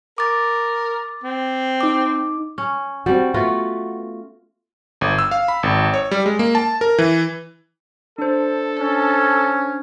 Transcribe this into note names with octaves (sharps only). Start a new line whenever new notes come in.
A#4 D6 A6
C4
D#4 D6
C#4
G3 C4 F#4
A3 B3 F4 F#4
G1
E6
F5
B5
G#1
C#5
G3
G#3
A#3
A5
A#4
E3
D4 A4 C5
C#4